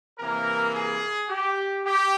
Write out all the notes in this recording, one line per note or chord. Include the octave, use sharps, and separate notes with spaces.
C3 E3 A#3 A#4
G#4
G4
G4